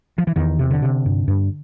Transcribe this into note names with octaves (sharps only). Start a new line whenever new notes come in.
F3
E3
E2 D#3
C3
D3
C3
G2
G2